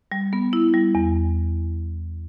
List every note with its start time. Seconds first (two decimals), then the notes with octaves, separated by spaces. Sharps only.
0.12 G3
0.33 B3
0.53 E4
0.74 G3
0.95 E2